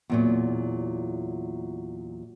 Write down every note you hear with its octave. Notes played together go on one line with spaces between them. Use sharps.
E2 A#2 F#3